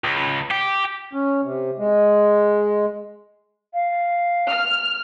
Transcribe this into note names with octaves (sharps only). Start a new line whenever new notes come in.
C#2
G4
C#4
C3
G#3
F5
F6